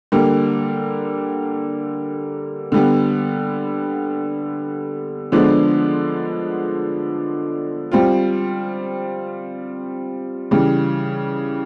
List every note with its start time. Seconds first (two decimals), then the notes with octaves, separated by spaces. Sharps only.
0.12 D3 G3 A#3
2.72 D3 G3 B3
5.32 D3 F3 G#3 B3 D4
7.92 G3 C4 F4
10.51 C#3 E3 G3